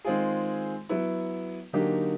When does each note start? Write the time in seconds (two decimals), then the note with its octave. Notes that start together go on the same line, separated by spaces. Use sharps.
0.05 D#3 G#3 C4 F4 G#4
0.89 F#3 B3 E4
1.73 D3 F#3 A#3 D#4 G4